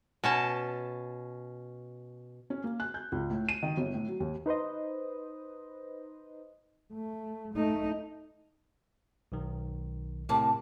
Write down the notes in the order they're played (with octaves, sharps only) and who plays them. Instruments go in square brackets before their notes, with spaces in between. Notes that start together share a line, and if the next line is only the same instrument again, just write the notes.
[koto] B2 C#4 A5
[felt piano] C#4
A#3
F#6
G6
C#2
A2
D#7
D#3
G1
A2
F#3
D#2
[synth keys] D#4 B4 C5 D#5
[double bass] A3
A3 D#4
[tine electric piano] B1 D#3
[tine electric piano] A2 C3 G4 [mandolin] A#3 A5